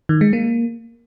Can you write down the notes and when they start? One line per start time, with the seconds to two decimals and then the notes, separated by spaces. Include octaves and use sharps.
0.09 D#3
0.21 G#3
0.33 A#3